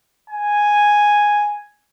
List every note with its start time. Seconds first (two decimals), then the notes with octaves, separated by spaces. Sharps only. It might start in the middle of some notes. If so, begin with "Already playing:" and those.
0.30 G#5